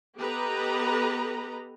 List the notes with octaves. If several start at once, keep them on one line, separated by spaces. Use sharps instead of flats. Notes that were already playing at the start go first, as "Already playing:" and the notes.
B3 G4 A4 B4 D#5 A#5